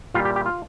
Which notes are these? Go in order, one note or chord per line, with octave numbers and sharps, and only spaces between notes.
A#2 G3 F4
G4
G4
F4